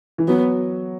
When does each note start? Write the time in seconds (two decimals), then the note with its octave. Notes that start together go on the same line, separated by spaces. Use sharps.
0.18 E3
0.28 F#3 B3